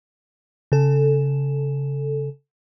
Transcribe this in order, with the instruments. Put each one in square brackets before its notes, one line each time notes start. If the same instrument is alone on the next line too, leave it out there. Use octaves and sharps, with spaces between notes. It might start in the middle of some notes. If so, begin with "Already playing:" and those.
[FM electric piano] C#3 A4